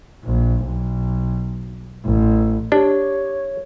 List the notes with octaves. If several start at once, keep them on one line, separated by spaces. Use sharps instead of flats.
A#1
B1
A1
D4 G4 C#5